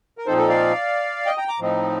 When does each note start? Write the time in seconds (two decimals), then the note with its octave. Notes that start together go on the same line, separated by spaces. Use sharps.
0.18 A#4
0.26 A#2 F3 C4 D#4 A4 C5
0.38 A4
0.49 D5 F5
1.26 D#5 G5
1.38 G5 A#5
1.48 A#5 D6
1.59 A2 F3 C4 D#4